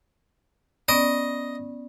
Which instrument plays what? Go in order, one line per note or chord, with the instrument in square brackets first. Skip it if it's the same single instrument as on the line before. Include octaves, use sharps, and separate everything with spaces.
[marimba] B3 C#4 D5 [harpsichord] D#5